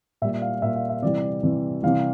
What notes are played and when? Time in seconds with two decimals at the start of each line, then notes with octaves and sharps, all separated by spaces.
0.22 A#2 E5
0.25 G3
0.42 F5
0.62 A#2 G3 E5
0.76 F5
0.89 E5
1.02 C3 E3 G3 D5
1.43 C3 E3 G3
1.83 C3 E3 G3 F5